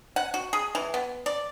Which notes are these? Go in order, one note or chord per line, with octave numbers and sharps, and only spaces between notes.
F#5
F#4
G#4
E3
B3
D5